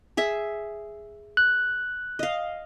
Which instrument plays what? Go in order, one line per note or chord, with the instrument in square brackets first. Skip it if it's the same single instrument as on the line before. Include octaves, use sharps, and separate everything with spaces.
[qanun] G#4 E5
[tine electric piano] F#6
[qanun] D#5 F5